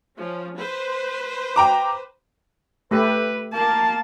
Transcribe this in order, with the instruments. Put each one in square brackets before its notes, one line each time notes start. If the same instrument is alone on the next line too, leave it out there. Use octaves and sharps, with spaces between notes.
[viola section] F3 C#4
B4 C5
[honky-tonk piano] G5 A#5 D6
[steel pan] A3 G4 A4 [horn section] B4
[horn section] A#3 [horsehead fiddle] A5